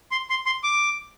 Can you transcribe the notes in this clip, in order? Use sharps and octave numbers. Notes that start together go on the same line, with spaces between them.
C6
C6
C6
D6